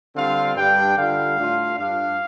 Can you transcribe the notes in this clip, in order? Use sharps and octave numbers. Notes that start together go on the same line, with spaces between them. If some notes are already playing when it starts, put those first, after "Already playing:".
D3 G3 C4 F4 F5
G2 G3 D4 G5
D3 G3 F4 F5
A2 A3 D4 F4
G2 G3 D4 F5